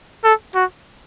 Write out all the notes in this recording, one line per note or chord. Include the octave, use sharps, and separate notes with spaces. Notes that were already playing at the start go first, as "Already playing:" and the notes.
A4
F#4